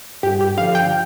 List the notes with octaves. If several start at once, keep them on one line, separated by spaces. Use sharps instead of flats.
G2 G4
G4
D3 F3 F5
G5